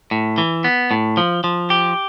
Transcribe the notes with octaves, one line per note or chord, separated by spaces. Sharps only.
A2
E3
B3
A2
F3
F3
G4